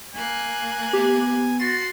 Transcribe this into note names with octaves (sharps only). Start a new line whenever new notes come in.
A#3 G#5 F#6
B3 G4
F#4 C6 A6